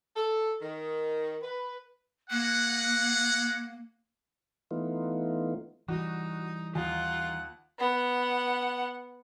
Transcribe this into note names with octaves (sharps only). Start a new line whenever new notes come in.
A4
D#3
B4
G#3 A#3 F#5
E3 A3 B3 D#4 F4
E3 G3 D#4 F#4
D#2 F4 F#5
B3 F#5